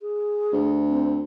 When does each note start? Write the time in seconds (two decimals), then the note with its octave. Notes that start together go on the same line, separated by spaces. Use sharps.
0.01 G#4
0.52 D2
0.89 C4